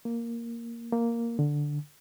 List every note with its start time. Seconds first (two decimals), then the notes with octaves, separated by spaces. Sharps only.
0.05 A#3
0.92 A#3
1.39 D3